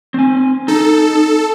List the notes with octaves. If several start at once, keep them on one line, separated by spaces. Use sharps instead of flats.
C4 G#5
D#4 A4